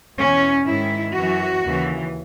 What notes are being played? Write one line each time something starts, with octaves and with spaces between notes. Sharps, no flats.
E2 B2 C#4
G#2 D#3 E4
F#2 E3 F#4
D#2 C#3 E3